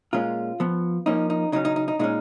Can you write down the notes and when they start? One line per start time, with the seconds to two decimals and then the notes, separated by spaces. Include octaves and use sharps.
0.13 A#2 G#3 C#4 F4
0.60 F3 B3
1.06 F3 A#3 C#4 D#4
1.30 D#4
1.52 C#3 F#3 C#4 D#4
1.65 D#4
1.76 D#4
1.88 D#4
1.99 A#2 G#3 C#4 D#4